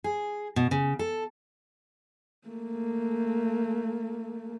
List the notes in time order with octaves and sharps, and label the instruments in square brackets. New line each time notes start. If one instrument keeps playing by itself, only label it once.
[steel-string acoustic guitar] G#4
B2
C#3
A4
[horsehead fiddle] A3 A#3